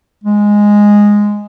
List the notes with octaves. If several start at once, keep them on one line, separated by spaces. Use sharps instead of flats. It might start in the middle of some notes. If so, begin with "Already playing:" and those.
G#3